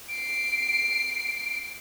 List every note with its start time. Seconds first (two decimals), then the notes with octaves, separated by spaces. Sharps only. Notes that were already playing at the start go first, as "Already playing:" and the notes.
0.10 C7 D7